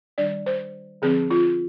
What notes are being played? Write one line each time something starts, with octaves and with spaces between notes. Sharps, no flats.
D#3 G3 D4 D5
C5
D3 F3 C4 G#4
F4